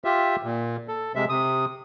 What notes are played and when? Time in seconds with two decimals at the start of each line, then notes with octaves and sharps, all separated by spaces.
0.04 F4 G4 E5
0.43 A#2
0.88 A4
1.16 C3 G#3 E5
1.29 C3 D#6